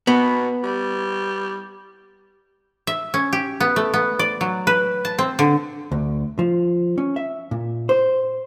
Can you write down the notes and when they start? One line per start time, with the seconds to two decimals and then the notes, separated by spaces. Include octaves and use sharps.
0.07 B2 B3
0.63 G3
2.87 E5
3.14 C#4
3.33 G4
3.60 B3
3.76 A3
3.94 B3
4.19 D5
4.41 F#3
4.67 B4
5.05 A5
5.19 C4
5.39 D3
5.92 D2
6.39 F3
6.98 C#4
7.16 E5
7.51 A#2
7.89 C5